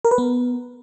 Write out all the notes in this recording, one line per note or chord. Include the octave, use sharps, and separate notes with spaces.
A#4
B4
B3